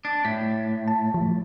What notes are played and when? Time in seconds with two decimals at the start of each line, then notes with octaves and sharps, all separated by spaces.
0.05 D4
0.25 A2 B6
0.88 A5
1.14 F3